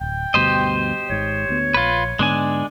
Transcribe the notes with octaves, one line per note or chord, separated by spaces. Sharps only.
D1 G5
D2 G2 B2 G4 C5 D#5
G#1 G#2 C#5
D2 B3
A#1 F4 B4
G#2 D3 G#3 B3 D4 G#5